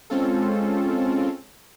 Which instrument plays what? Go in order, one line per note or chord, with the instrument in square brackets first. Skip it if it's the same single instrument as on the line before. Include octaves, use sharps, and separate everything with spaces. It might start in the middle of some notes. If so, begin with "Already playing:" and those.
[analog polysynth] G#3 C4 C#4 F4 A4